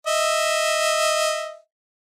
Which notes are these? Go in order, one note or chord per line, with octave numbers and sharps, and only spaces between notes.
D#5 E5